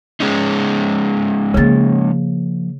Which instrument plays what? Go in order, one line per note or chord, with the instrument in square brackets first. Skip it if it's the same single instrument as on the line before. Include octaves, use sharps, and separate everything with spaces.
[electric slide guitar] G#3 C#4 D#4
[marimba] C#3 G#4 A6 [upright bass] F3 A#3